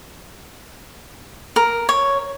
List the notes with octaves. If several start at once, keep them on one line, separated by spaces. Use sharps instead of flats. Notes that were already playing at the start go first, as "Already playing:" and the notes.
A#4
C#5